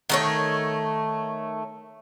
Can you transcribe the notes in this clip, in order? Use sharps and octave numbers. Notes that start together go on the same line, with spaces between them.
D#3 A3 C#5